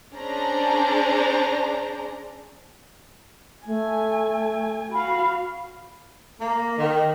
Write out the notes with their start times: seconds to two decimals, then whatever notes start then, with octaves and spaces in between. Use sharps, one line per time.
0.16 C#4 D4 G#4 C5 D5 A#5
3.66 A3 G#5
4.92 F#4 F5 B5
6.40 A#3
6.78 D#3